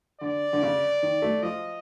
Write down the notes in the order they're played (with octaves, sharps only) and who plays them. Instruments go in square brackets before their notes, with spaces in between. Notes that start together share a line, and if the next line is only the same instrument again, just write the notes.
[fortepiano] D3 [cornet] D5
[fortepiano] D3
C#3
D#3
A3
[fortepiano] F3 [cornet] D#5